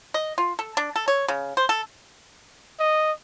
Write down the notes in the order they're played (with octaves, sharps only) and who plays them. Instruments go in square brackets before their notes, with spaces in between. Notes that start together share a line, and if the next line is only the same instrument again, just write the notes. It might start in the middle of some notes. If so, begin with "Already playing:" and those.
[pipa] D#5
F4
A4
D4
A4
C#5
C#3
C5
A4
[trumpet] D#5